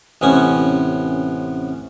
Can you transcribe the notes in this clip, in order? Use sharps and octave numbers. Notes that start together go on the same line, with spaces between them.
A1 C3 B3 C#4 G#5